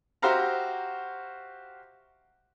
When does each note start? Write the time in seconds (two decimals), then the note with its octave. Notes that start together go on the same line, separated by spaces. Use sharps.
0.22 F#4 G4 C5 E5 F5 A#5